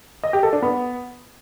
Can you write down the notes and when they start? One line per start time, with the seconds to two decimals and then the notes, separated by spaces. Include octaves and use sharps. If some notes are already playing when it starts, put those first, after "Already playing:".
0.23 D#5
0.33 G4
0.43 A4
0.53 D4
0.62 B3